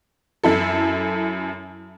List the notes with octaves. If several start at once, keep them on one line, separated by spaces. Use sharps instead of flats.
F#2 E4 A4